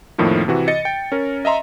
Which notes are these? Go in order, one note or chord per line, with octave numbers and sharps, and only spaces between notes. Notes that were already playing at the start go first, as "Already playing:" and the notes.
F2 A2 D#3 F3 A#3
C3 E3 F#4
D#5 A6 C#7
G5
C#4 A#4
D#5 E5 A#5 C6